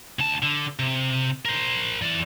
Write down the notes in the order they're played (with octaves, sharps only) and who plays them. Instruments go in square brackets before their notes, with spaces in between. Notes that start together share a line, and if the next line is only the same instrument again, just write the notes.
[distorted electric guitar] D2 A5
D3
C3
A#4 C5
E3 D5